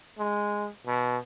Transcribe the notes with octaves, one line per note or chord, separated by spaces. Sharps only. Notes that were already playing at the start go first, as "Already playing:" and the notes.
G#3
B2